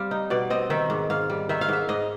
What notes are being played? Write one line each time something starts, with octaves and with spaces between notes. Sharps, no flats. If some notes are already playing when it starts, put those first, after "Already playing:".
Already playing: G3 C4 F5
D#4
B2 D5
C4 D#5
D#3 E5
G#2
G#2 F5
G3
D#3 E5
F5
G#2 E5
G#2 D#5